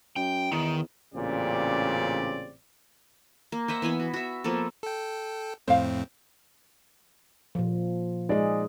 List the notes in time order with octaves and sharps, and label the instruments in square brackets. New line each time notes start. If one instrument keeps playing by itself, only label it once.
[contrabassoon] F#2 [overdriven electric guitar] G5
[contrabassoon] E2 [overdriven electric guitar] D#3
[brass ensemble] A1 A#2 C#3 C4 G4 D5
[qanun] A#3
C5 D#5 E5 F#5
E3 B3 G#5 B5
F#4
F#4 E5
F3 A#3 B3 A4
[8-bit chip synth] A4 G5
[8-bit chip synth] F2 A2 C4 [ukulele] C5 F5
[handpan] A#2 F3
[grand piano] G#3 D5 [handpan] D#4 G#4